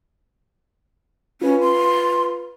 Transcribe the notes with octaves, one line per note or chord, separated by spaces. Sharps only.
C#4 F4 B4
C6